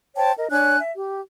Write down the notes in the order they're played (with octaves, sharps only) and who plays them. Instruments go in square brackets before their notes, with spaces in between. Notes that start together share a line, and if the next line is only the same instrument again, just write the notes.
[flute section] C5 C#5 G5 A5
A#4 D#5
D4 C#5 G#5 F#6
E5
G4